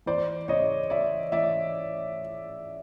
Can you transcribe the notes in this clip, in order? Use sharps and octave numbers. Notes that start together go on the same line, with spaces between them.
E3 C5 D5
C#3 C#5 D#5
E3 D5 E5
E3 D5 E5